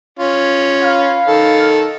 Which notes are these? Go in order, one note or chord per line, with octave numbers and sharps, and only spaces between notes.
C#4 F4
B4 F5
D#3 A4